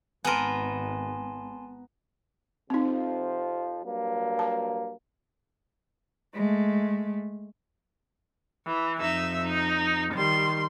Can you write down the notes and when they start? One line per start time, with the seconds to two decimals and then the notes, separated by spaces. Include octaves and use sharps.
0.25 G#1 B3 A#4 G#5 A5 C6
2.70 F2 C3 F3 C4 D#4
3.83 G2 F#3 A#3
4.39 A5
6.34 G#3 A3
8.66 E3
9.01 F2 D#4 E5
9.43 D#4
10.13 D#3 G3 C6